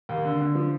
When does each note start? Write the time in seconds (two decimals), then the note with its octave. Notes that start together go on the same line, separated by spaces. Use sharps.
0.09 D#2
0.25 D3
0.41 D3
0.55 F3